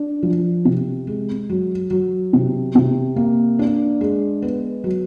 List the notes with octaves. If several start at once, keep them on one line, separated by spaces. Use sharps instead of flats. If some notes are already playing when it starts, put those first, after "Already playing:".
Already playing: D4
F3
C3
G#3
F#3
F#3
C3
C3
A#3
D4
G#3
B3
F#3